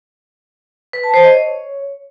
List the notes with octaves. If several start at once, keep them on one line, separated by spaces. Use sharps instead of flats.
B4
A5
C5
D#5
C#5